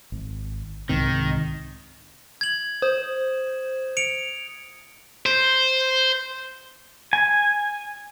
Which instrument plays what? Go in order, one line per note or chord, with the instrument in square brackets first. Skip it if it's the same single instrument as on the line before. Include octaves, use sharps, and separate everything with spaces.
[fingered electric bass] G#1
[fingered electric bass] C2 G#2 C4 [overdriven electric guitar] D#3
[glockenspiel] G#6 F#7
[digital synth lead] C5 [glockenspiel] D#6
[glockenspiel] C#7 D7 F7
[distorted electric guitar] C5
[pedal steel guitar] G#5